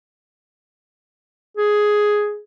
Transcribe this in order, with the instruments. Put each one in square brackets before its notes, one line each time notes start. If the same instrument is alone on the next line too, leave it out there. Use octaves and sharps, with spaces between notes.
[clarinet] G#4